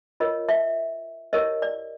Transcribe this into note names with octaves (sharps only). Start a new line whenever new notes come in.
F4 A#4 C#5 D#5
E5
E4 G4 A#4 C#5 D#5
D5